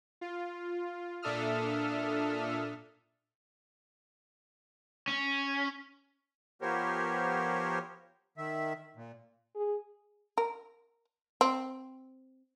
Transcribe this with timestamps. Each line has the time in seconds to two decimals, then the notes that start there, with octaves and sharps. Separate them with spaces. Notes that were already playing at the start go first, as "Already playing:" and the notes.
0.21 F4
1.22 A#2 D4 A4 E5 D#6 F6
5.08 C#4
6.62 F3 B3 G4 A#4 C5 C#5
8.38 D#3 E5
8.96 A#2
9.55 G#4
10.38 A#4
11.41 C4